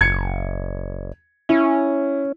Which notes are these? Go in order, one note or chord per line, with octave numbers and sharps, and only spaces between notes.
F#1 G#6 C#7
C#4 E4